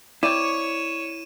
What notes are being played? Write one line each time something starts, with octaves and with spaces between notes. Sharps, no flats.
C4 E4 C#5 D5 C#6 D#7 E7